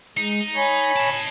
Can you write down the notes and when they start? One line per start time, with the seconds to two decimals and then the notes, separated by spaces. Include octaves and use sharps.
0.17 G#3 D#4
0.56 C#5 G#5 B5
0.96 D#5 A5